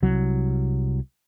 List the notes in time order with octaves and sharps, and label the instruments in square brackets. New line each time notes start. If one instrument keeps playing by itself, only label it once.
[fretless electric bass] C2 F#3